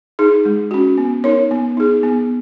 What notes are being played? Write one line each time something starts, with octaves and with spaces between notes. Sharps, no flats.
D#4 G#4
G#3
C#4 F#4
B3
D#4 A#4 C#5
B3
D#4 G#4
B3